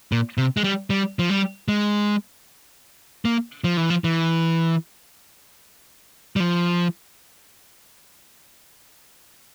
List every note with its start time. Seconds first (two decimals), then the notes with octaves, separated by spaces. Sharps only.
0.12 A#2
0.38 C3
0.57 G#3
0.64 G3
0.90 G3
1.19 F3
1.30 G3
1.68 G#3
3.25 A#3
3.64 F3
3.77 E3
3.90 F3
4.04 E3
6.36 G3
6.40 F3